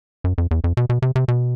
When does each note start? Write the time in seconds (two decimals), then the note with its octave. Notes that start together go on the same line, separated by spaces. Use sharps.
0.24 F#2
0.38 F2
0.51 E2
0.64 F2
0.77 B2
0.90 B2
1.02 C3
1.16 C3
1.28 B2